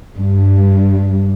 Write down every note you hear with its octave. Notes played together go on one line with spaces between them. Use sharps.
G2